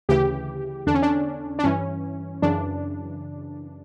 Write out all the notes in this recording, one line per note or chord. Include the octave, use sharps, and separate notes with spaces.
D2 C#3 E3 G4
E2 D3 D4
C#4
D4
D4
G2 E3 C#4
F#2 C#3 E3 D4